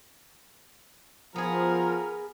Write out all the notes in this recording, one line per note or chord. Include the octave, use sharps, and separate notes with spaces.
F3 B3 G#4 A#4